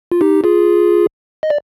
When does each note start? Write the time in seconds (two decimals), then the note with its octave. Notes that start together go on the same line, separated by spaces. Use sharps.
0.12 F4
0.21 D#4 G4
0.44 F4 G#4
1.43 D#5
1.50 D5